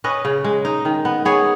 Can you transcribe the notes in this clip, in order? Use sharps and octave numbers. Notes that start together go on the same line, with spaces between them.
C#4 B4 D#5
C#3
G#3
D#4
D#3
B3
B3 G#4 C#5